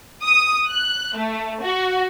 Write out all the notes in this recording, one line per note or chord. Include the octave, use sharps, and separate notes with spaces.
D#6
F#6
A3
F#4